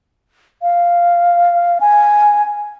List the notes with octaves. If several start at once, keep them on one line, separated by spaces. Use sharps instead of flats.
F5
G#5